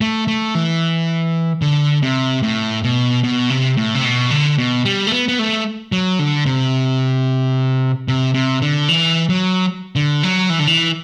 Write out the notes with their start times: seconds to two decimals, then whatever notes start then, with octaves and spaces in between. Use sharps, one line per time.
0.01 A3
0.27 A3
0.55 E3
1.62 D3
2.02 C3
2.43 A2
2.84 B2
3.23 B2
3.50 C3
3.77 A2
3.95 C3
4.04 B2
4.31 D3
4.58 B2
4.85 G3
5.07 A3
5.12 B3
5.28 B3
5.39 A3
5.92 F#3
6.19 D3
6.46 C3
8.08 C3
8.34 C3
8.62 D3
8.88 E3
9.29 F#3
9.96 D3
10.23 F#3
10.50 E3
10.59 D3
10.67 E3